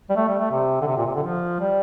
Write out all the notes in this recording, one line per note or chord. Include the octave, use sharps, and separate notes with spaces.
G3
A3
G3
A3
C3
D3
C3
A#2
C3
D3
F3
G3